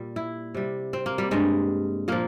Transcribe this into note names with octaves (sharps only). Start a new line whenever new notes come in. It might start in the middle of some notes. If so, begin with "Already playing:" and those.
Already playing: A#2 G3
E4
C3 G3
C4
A#3
G3
G2 G3 G#3
A#2 F3 A#3